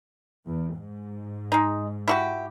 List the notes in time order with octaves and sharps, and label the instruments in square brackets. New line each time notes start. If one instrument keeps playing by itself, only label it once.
[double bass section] E2
G#2
[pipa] G#3 D#4
E4 F#4 G4